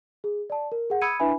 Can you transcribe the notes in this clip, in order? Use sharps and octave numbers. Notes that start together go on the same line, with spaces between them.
G#4
D5 A5
A#4
G#4 F#5
B5 D#6 E6 G#6 C#7 D#7
D4 E4 B4 E5 G#5 B5